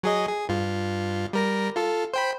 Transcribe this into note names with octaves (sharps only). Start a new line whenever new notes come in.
F#3 G#4 D#5
G#4
G2 F4
G3 A#4 A#6
F4 A4
C5 G5 B5